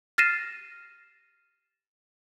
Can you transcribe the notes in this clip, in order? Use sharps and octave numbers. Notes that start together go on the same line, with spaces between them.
F6 A6 A#6 C7 D#7 E7